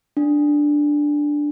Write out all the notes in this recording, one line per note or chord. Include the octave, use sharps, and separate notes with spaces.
D4